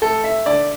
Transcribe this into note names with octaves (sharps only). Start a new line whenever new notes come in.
A3 A4
E5
D3 D5